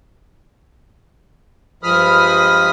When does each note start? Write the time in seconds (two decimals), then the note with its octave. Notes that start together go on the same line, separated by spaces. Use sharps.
1.83 G2 F3 G#3 B5 D#6 F6